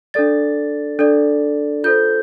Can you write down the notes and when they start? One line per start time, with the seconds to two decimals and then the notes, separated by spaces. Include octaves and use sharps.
0.14 D4 A4 D5 A6
0.99 D4 A4 D5
1.84 F4 A4 C5 G6